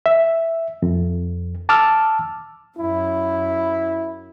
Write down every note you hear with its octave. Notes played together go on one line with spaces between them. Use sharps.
E5
F2
A5 D6 E6 F6
F#2 E4